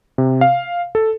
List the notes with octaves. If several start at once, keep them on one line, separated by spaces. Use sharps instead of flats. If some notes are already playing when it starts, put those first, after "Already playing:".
C3
F5
A4